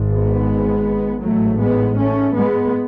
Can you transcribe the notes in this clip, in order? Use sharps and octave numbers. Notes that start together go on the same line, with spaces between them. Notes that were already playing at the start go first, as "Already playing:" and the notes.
Already playing: G#1 G#2
G#3 B3
A1 G#2 F#3 A3
G#3 B3
A3 C#4
G#3 B3